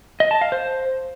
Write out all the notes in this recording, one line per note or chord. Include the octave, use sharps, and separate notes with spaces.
D#5
A5
F5
C5